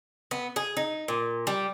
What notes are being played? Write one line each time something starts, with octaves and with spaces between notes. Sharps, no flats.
B3
G#4
D#4
A#2
G3